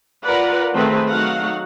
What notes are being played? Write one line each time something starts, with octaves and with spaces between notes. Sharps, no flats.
F4 A#4 B4 D5 F#5
D#3 A3 C4 G#4 B4
F#3 A3 D#4 F#4 F5 F#5